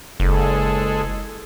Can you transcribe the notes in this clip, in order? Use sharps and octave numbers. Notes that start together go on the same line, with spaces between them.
F#1 G#3 G#4 A4